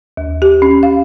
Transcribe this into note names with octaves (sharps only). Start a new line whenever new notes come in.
D#2
G4
C#4
F5